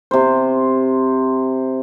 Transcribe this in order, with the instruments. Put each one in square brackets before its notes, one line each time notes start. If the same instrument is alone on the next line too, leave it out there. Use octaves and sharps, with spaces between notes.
[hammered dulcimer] C3 C5